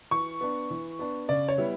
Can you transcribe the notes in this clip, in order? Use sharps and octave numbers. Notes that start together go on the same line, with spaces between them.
E3 C#6
B3 D4
E3
B3 D4
C#3 D5
C#5
G3 B3 E4